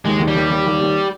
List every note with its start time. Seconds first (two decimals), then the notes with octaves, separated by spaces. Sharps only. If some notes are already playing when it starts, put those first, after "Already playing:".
0.06 D#2 G#3
0.20 D#2
0.28 G3
0.35 D#2
0.50 D#2
0.66 D#2
0.81 D#2